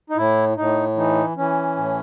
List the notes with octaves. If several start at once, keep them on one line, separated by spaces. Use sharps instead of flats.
D#4
A2 E4
A2 D#4
E3 D#4
E3 C#4
A2